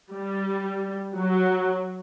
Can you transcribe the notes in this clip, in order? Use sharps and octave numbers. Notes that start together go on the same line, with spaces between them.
G3
F#3